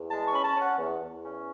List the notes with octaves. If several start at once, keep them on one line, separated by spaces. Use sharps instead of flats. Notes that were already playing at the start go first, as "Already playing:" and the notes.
Already playing: E2
G#3 A5
C#6
C#4 B5
A5
C#4
F#5
E2
E2
C#4